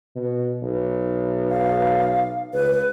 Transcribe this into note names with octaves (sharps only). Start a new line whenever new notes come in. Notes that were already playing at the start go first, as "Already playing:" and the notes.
B2
B1
F5
C#2 B4